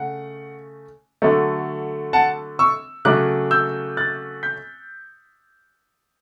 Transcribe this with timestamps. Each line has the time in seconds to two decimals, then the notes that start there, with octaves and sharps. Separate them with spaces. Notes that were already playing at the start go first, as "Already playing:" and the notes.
Already playing: C#3 A3 F#5
1.22 D3 F#3 A3
2.13 F#5 A5
2.59 C#6 E6
3.05 C#3 F#3 A3 D6 F#6
3.51 E6 G6
3.97 F#6 A6
4.43 G6 B6